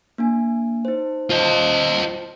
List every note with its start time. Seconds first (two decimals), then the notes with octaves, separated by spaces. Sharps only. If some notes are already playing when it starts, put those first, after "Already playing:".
0.18 A#3 D4 G#5
0.85 D#4 C5
1.30 F4 C5 D#5 A5 C6